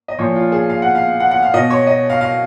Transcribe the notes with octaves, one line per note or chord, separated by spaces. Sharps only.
D#5
A#2 F3 C#5
F4
G#4
F5
F#5
F5
F#5
F#5
F5
B2 D#5
C#5
D#5
F5
F5